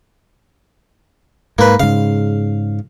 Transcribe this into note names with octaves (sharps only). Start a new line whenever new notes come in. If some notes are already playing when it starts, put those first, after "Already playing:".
G#2 A#3 B4
G#2 C#3 F5